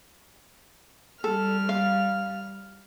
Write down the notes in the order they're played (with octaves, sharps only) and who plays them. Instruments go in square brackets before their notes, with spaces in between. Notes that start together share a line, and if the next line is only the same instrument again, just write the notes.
[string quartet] G3 F6 [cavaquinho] A4
[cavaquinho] F5